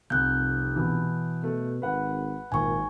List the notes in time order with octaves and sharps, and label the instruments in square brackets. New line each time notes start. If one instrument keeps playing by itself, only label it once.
[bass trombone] F1 [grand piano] C2 [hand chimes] F#6 G6
[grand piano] B2 E3
[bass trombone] B2 [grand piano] A3
[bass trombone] G#1 [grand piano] B4 F#5
[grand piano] G#1 [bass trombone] A#2 [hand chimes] G#5 C#6